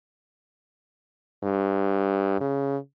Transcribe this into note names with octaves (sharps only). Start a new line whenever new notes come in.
G2
C#3